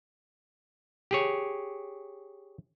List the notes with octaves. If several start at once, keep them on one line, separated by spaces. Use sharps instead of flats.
G4 G#4 C#5